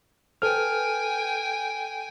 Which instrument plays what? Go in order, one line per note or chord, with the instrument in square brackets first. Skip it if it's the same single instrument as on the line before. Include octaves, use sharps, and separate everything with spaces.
[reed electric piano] A4 F6 [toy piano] B4 C5 [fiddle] G5 G#5